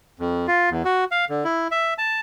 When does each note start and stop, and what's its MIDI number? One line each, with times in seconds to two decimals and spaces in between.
0.19 0.47 41
0.48 0.70 65
0.71 0.83 40
0.85 1.04 66
1.11 1.25 77
1.29 1.44 50
1.44 1.68 64
1.71 1.94 76
1.98 2.20 81